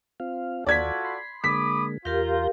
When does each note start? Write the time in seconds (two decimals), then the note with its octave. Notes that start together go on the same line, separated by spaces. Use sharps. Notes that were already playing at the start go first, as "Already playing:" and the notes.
0.20 C4 F4 F5
0.66 D#2 F4 F#4 A4 D5 G#6 B6
1.05 B5 C6
1.44 D3 G#3 A#3 B5 D6 D#6 B6
2.05 E2 F4 G4 A#4 F5 A#5 G6